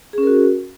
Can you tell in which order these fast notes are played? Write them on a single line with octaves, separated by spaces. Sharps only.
G#4 C#4 A#4 F#4